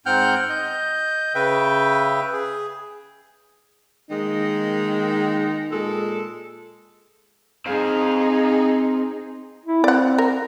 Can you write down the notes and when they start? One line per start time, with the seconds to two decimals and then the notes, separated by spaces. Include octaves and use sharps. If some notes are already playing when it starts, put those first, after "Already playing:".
0.06 G#2 C4 F#5 G5 F6 G6
0.50 D#5 G6
1.35 C#3 B4 E5 G5
2.33 G#4
4.09 D#3 G#3 A#3 D#4
5.70 A#2 G#3 A4
7.66 C4 D#4 G#4 F5
9.66 E4
9.84 C4 D5 F#5
10.18 A#4